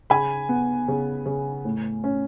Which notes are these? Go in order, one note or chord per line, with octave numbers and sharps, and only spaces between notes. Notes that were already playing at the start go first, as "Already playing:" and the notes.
C#3 G#5 B5
B3
C#3
C#3
A2
C#4